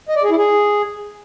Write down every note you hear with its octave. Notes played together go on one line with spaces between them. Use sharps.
D#5
D5
G#4
E4
G#4